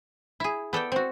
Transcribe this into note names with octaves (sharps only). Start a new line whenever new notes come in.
E4 G#4
B3 A4 D5 G5
C4 F#4